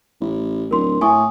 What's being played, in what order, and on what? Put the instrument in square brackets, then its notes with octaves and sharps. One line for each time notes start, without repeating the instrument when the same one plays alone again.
[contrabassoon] A1
[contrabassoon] D1 [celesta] A#4 C6
[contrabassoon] A2 [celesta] G#5 C#6 D#6